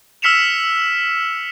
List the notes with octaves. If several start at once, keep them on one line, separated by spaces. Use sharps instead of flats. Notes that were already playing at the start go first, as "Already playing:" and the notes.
E6 F6 B6 C#7 E7 F7